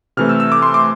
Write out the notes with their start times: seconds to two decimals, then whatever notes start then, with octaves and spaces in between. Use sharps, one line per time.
0.17 C3 E3 A3 F6
0.29 E6
0.40 E6
0.52 D6
0.62 C6
0.74 D6